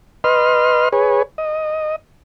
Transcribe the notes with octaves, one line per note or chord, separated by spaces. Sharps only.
B4 D#5 C6 F6
G#4 B4 C#5
D#5